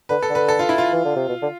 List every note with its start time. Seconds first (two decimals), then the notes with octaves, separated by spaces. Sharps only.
0.09 D3 B4
0.22 A4
0.30 D3
0.35 B4
0.48 A4
0.59 F4
0.69 E4
0.78 F4
0.93 E3
1.05 D3
1.16 C3
1.29 B2
1.42 D3